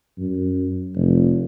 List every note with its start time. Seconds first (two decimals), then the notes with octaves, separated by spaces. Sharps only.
0.18 F#2
0.95 F1